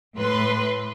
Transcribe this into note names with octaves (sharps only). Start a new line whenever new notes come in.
A2 B4 C6